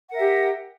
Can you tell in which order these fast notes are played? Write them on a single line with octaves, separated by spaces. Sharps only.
F#5 A#4 E5 G4